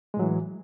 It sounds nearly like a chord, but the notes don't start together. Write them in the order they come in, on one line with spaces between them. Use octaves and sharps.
G#3 A2 F#3 E3